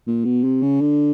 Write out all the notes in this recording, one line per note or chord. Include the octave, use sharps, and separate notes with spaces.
A#2
B2
C3
C#3
D3